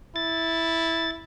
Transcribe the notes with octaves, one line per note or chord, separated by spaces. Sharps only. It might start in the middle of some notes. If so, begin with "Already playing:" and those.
E4 A6